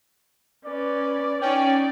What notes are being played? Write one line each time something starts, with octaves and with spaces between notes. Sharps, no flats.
C#4 B4 D5
C#4 D#4 D5 G5